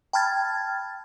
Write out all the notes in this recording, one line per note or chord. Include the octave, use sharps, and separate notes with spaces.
G5 A5 B5 F6 G#6 A6